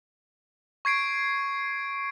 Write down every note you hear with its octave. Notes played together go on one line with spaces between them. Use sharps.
C#6 G#6 C7 D7